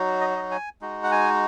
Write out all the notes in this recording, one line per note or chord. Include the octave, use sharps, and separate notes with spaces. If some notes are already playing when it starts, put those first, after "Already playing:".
Already playing: F#3 D#4 F#4
D#5
D#5
G#5
G#3 D#4 F#4
F#5
G#5